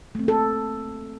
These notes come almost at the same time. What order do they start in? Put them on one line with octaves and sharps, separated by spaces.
A3 C4 A#3 A4